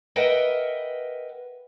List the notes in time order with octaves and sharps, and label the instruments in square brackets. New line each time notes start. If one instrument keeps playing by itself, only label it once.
[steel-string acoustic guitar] A#4 B4 D#5 E5 F#5 G5